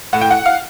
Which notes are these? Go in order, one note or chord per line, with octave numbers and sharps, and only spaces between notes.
A2 F#5
G5
F#5
F5